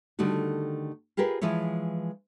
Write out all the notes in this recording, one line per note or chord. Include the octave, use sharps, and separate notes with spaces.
D3 D#3 G3 A3 F#4
F4 G4 G#4 A#4 B4
E3 F3 G#3 E4 C#5